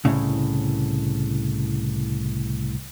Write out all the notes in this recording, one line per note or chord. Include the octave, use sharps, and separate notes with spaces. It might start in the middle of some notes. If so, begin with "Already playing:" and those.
C2 A2 C#3